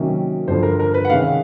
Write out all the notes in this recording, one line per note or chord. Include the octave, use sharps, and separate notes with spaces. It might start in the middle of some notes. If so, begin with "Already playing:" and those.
Already playing: C3 D#3 F#3 A#3 C#4
G2 D3 F3 C5
A#4
A#4
B4
F#5
C3 D#3 G#3 C#4 F5